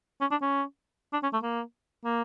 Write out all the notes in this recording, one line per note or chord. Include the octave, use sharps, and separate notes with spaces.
C#4
D4
C#4
D4
C#4
A3
A#3
A#3